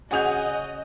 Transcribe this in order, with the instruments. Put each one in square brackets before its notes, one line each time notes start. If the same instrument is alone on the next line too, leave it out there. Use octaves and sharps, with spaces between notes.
[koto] C#3 [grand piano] F#4 D#6 G6 [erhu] D#5 [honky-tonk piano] F#5 G#5 F7